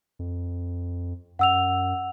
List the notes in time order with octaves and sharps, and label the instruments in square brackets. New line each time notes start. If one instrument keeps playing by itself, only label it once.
[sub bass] F2
[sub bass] F#2 [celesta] F#5 E6 F7